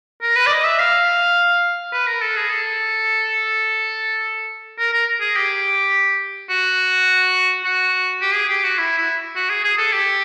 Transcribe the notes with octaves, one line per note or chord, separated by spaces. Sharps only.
A#4
B4
D5
D#5
E5
F5
B4
A#4
A4
G#4
A4
A#4
A#4
G#4
G4
F#4
F#4
G4
G#4
G4
F#4
E4
E4
F#4
G#4
G#4
A4
G4